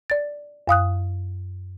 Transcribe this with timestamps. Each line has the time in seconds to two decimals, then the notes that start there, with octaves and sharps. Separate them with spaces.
0.10 D5 A6
0.68 F#2 F5 D#6 F#6